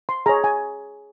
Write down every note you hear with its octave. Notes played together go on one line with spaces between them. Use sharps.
C6
G#4 C#5 A#5
G#5